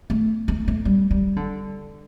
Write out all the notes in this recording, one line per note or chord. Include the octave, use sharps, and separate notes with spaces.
A3
A3
A3
G3
G3
D3